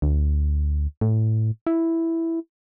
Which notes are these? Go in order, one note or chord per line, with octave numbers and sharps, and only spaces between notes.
D2
A2
E4